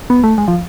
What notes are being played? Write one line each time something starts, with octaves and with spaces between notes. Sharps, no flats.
B3
A3
G#3
F3